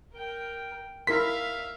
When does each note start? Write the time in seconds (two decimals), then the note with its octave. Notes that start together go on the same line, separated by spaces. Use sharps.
0.13 A#4 G5
1.07 E4 A#4 E5 F5 C6 B6